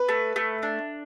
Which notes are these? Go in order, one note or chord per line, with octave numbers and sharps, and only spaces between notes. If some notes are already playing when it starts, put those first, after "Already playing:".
Already playing: B4
A3
A3
D4